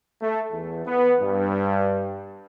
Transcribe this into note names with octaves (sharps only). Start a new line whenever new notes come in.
A3
E2
B3
G2